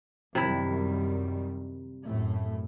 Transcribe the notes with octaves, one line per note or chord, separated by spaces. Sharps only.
F#2 C3 D#3 G3 E4
F#2 A2 A3